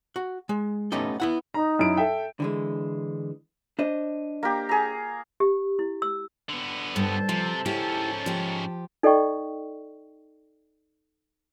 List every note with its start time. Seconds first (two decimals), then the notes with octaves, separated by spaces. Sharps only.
0.16 F#4
0.49 G#3
0.92 A3 B3 C#4 D#4 G4 A4
1.20 B3 E4 F#5
1.54 D#4 A#5
1.79 F#2 E4 D7
1.97 A4 E5 G5
2.40 D3 E3 G#3
3.79 D4 C5 D#5
4.43 A#3 G4
4.69 G#4 A#5
5.40 G4
5.79 E4
6.02 E6
6.49 D3 B3
6.96 G2 A4 C5 A5
7.29 C3 F3
7.66 G#2 C#4 E4 G4
8.26 F3 G4
9.03 D#4 A4 D5 D#5 G5 C#6